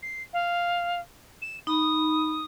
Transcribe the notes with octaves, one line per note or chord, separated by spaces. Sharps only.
C7
F5
E7
D#4 B5 D#6